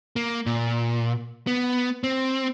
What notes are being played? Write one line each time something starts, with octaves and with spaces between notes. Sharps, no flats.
A#3
A#2
B3
C4